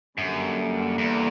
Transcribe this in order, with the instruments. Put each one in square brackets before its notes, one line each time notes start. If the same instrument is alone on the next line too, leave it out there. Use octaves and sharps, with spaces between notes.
[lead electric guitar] F#2 [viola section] D3 G3 A#3
[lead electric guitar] E2